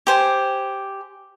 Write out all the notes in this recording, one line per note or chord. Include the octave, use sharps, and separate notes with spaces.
G4 C5 G#5